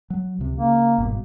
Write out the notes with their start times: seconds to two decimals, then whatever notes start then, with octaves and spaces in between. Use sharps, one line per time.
0.10 F#3
0.39 C#2 C3
0.58 C#3 A#3
0.98 G1 G#2 B2